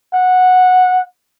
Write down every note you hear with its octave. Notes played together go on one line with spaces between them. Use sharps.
F#5